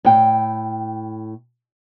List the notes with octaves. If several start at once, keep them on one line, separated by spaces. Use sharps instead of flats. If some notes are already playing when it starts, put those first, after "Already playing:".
A2 G5